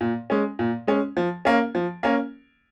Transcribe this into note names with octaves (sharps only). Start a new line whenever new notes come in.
A#2
G#3 C#4
A#2
G#3 C#4
F3
A#3 C#4
F3
A#3 C#4